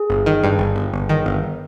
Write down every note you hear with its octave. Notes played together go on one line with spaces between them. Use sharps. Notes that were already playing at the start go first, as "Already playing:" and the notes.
Already playing: G#4
G1
D#3
G2
G1
G1
G1
D#3
G1